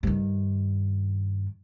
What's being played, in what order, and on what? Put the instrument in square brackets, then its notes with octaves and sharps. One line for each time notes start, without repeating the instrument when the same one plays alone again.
[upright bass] G2 D#3